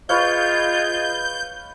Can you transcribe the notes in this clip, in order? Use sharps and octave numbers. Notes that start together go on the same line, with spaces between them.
F4 G#4 B4 C#5 D#5 F5 G6